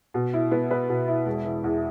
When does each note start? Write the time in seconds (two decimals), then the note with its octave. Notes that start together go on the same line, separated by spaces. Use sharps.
0.14 B2
0.33 E4
0.52 B3
0.71 B4
0.89 B2
1.08 E4
1.26 E1
1.45 E3
1.64 E2